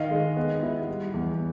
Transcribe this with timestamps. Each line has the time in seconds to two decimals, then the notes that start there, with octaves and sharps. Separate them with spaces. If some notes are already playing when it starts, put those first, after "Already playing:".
Already playing: D#3 D#5 F5
0.11 G#3
0.37 B3
0.63 E4
0.88 G3
1.14 E2